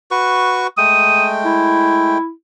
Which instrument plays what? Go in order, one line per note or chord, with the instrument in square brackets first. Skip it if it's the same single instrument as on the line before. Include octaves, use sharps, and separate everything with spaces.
[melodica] F#4 B4 C#6
[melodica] G#3 A3 G5 [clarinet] D#6
[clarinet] E4